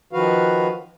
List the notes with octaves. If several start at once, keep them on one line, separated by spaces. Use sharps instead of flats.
D#3 F3 F#4 B4 F5